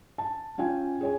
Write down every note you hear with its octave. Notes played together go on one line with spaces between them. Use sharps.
A5
C#4 F4 G5 G#5
G#4 C#5 G#5